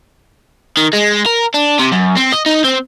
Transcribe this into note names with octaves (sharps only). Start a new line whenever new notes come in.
D#3
G#3
A#4
D4
C3
F#2
C4
D#5
D#4
C4